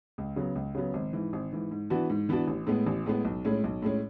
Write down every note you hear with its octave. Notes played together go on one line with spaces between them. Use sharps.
C#2
C#3 F#3 B3
C#2
C#3 F#3 B3
G#1
G#2 E3
G#1
G#2 E3
G#2
E3 B3 D4 F#4
G#2
E3 B3 D4 F#4
A1
A2 G#3 B3
A1
A2 G#3 B3
B1
A2 G#3 C#4
B1
A2 G#3 C#4